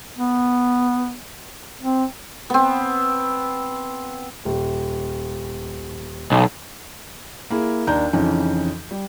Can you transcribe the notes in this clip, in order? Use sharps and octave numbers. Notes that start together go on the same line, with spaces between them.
B3
C4
B3 C4
D#1
B1
A#3 E4 G#4
D#2 D4 A#5 G6
F2 C#3 E3 C#4 D#4
G3